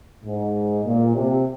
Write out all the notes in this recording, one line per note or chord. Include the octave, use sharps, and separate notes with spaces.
G#2
A#2
C3